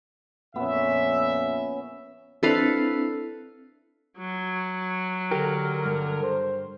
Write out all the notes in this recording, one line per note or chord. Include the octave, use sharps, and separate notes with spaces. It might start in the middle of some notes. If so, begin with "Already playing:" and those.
F2 A#2 B3 C#4 E5
C4 D4 E4 A4 B4 F5
F#3
D3 G4 A#4
G2
C5